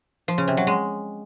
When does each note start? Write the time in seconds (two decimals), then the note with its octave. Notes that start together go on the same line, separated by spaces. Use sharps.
0.28 F3
0.38 C#3
0.48 C3
0.57 F#3
0.67 G#3